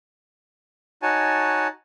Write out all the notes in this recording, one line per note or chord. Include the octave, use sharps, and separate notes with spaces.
D#4 F#4 C#5 G#5 A5